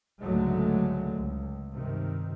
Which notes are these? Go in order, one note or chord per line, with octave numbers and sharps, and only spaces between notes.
C#2 G#2 D3 F#3 G#3 A3
C#2
G2 C3 D#3